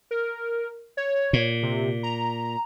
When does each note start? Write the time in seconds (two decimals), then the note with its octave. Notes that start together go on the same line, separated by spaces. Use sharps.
0.11 A#4
0.97 C#5
1.33 A#2
1.63 C3
2.03 A#5